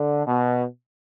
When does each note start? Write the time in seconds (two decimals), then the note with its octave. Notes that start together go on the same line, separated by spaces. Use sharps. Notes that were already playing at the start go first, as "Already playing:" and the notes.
Already playing: D3
0.27 B2